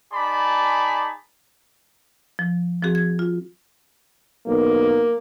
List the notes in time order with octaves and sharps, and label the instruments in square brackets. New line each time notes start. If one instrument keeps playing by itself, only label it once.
[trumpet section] D#4 G#4 D5 A5 B5
[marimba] F3
F3 C4 F#4 G#4
G#6
F4
[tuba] B1 [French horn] A#3